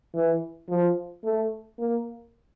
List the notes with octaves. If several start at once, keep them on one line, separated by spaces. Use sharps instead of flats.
E3
F3
A3
A#3